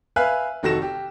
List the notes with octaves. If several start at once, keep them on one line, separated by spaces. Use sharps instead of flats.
B4 E5 F5 G#5 F6 F#6
F1 D#3 F#4 A4 A#6 E7
G4